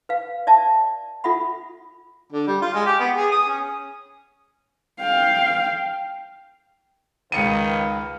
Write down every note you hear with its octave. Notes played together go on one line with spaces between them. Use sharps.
B4 F5
D5 E5 A5
F4 A4 E5 F#5 B5
D3
G3
F4
G#3
G4
B3
G#4
D#6
C#4
F5 G5
C#2 D#3 B4 F5 C#7 D#7